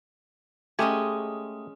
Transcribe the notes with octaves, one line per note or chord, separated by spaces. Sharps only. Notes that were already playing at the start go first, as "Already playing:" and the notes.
G#3 A3 C#4 G4 D#5 G#5